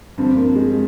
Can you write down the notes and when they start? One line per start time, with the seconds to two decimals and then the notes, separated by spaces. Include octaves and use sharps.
0.18 G2 D3 F3 C4
0.36 A#3
0.56 G#3